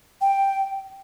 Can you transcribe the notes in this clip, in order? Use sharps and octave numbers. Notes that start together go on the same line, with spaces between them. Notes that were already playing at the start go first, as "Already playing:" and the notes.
G5